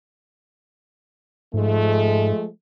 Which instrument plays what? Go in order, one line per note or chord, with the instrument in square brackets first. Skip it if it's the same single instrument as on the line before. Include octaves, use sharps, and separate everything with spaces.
[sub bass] G#2 [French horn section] F3 G#3 A3